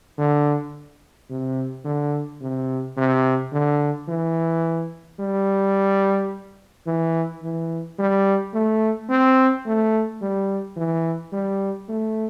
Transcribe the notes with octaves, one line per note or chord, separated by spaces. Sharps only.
D3
C3
D3
C3
C3
D3
E3
G3
E3
E3
G3
A3
C4
A3
G3
E3
G3
A3